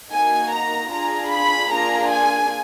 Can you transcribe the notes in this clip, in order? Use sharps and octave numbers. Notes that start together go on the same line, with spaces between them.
A#3 D#4 F#4 G#5
A#5
D4 F4 G#4 A#5
B5
A#3 D4 F4 G#4 A#5
G#5